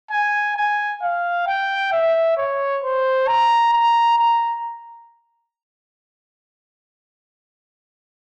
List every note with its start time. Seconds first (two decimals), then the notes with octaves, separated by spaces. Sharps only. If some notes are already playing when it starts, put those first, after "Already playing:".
0.11 G#5
0.56 G#5
1.02 F5
1.47 G5
1.92 E5
2.37 C#5
2.83 C5
3.28 A#5
3.73 A#5
4.19 A#5